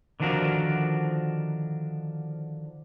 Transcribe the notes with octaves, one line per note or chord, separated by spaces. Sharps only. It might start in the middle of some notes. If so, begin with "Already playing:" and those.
D3 D#3 F3 D4 F#4 A#4